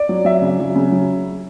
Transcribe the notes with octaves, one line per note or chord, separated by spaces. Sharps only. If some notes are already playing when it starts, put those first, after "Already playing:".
Already playing: D5
F#3
F#3 E5
C#3
F#3
C#3
F#3